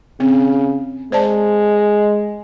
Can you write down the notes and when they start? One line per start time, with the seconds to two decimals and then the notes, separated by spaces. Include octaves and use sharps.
0.20 C#3 C4
1.12 G#3 C5 D5 A5